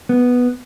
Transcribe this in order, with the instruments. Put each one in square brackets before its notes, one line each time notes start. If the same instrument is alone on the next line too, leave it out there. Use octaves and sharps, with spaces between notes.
[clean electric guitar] B3